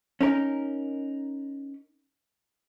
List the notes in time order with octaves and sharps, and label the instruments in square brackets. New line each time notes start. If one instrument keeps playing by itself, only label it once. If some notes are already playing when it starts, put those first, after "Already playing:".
[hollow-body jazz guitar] C#4 D#4 A#4